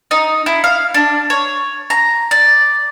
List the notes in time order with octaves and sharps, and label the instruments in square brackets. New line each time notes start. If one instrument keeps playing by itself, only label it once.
[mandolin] D#4
E4
F5
D4
C#5
A#5
D5